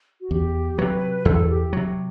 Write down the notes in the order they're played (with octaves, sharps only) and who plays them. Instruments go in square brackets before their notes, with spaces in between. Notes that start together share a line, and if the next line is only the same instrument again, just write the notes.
[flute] F#4
[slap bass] E2 [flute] G4
[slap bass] C3 F#3 [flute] B4
[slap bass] E2 [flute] A4
[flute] G4
[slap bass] C3 F#3